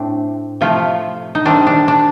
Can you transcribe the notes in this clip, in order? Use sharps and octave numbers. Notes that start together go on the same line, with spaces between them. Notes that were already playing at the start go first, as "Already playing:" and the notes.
Already playing: A2 A3 C4 D4
C3 F3 A3 F4
D#4
C3 D#3 G3 C4 D4
D4
D4